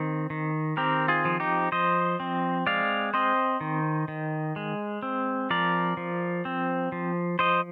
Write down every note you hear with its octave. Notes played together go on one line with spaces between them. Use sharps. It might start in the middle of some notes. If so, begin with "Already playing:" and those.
Already playing: D#3 C4
D#3
C4 G4 A#4
F4 G#4
F3
D#4 G4
F3 C5 D#5
C4
G#3 D5 F5
C4 C5 D#5
D#3
D#3
G#3
C4
F3 A#4 D5
F3
C4
F3
F3 C5 D#5